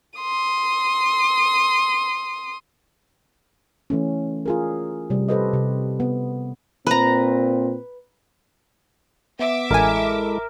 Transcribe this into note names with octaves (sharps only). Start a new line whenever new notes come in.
C6 D#6
E3 A3 C#4
F4 G#4 A#4
C3 G3
G4 A4 B4 C5 D#5
C3
B3
A#2 C4 B4 A#5
B3 E5 D6
A1 G#3 E4 A4 A#4 G#5